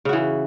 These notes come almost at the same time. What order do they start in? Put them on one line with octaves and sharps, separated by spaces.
C#3 F#4 E3